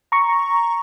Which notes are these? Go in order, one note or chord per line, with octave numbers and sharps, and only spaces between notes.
A#5 C#6